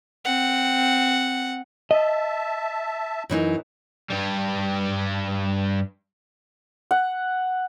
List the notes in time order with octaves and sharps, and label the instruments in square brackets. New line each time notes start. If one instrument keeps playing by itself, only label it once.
[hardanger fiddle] C4 F#5
[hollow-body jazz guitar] D#5 [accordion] E5 A5
[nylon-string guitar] F#2 E3 D#4
[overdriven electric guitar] G2 G3
[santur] F#5